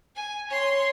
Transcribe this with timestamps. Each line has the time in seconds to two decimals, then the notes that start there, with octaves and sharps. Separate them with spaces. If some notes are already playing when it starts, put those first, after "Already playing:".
0.16 G#5
0.50 C#5 C6